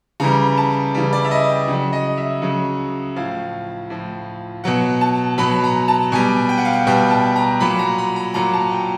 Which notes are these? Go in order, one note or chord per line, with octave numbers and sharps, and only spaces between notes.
C#3 E3 G3 A#5
A5
C#3 E3 G3
D5
E5
D#5
G5
C#3 F#3
D#5
E5
C#3 F#3
A2 F3 F5
A2 F3
B2 F#3 F#5
A5
B2 F#3 B5
A#5
A5
B2 G3 G#5
G5
F#5
F5
F#5
B2 G3 G5
A5
A#5
A#2 F#3 B5
A#5
B5
A#5
A#2 F#3 A#5
A5
G5